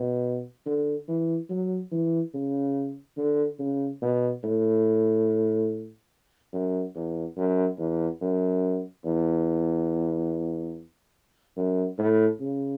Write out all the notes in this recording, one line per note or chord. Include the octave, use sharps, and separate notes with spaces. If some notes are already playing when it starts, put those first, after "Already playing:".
Already playing: B2
D3
E3
F#3
E3
C#3
D3
C#3
B2
A2
F#2
E2
F#2
E2
F#2
E2
F#2
A2
C#3